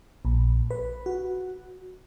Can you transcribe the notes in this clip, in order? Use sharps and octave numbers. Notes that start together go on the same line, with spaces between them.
A#1
B4
F#4